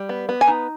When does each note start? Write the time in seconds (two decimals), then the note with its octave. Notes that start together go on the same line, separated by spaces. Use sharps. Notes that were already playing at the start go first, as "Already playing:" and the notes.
Already playing: G3
0.09 B3
0.29 B3
0.41 G#5
0.48 D#4